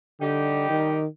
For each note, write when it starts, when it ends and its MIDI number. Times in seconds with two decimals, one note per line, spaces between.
0.21 0.69 50
0.21 1.00 55
0.21 1.00 63
0.21 1.00 67
0.70 1.06 51